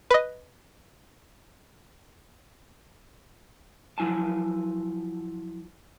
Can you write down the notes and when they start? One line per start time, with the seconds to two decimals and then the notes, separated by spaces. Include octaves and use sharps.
0.10 B4 D#5
3.98 F3 F#3 E4 G#5 A5